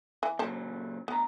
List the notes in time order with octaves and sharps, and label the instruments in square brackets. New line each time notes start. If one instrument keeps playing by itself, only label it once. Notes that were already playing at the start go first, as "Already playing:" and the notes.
[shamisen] E3
[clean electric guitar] A#2 C#3 F#3 [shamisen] C5 A5
[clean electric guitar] D2 A#5 [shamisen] B3